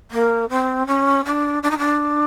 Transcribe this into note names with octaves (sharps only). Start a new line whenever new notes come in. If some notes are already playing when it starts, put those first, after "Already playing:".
A#3
C4
C#4
D4
D4
D#4
D4